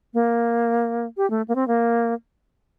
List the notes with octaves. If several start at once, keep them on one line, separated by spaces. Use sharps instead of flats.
A#3
G4
A3
A#3
C4
A#3